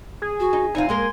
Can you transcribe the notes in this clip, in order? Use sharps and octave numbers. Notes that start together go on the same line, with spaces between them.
G#4
F#4
D#4
E2 C4 D#4 F4 G#5
G#3 A#3 A#4 C6